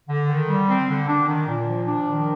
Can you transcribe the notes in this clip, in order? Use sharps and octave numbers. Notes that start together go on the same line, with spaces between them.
D3
D#3
G3
C4
D3
D4
D#3
A#2
F3
D4
D#3